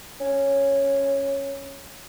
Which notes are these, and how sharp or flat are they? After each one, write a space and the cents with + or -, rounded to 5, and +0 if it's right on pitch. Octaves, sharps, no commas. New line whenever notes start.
C#4 -5